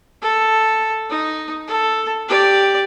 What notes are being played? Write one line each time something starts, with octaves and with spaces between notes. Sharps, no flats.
A4
D#4
A4
G4 D5